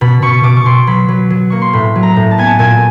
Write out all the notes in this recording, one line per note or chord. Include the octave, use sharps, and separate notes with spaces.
B2 B5
B2 C#6
B2 D6
C#6
B2 C6
F#3 B5
F#3
F#3
A#3 C#6
C6
A2 B5
F#3
A#5
A2
A5
B3 G#5
A5
A#2 G#5